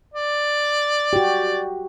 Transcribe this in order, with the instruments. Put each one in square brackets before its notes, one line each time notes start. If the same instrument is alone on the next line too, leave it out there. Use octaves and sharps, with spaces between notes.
[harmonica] D5
[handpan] F#4 G4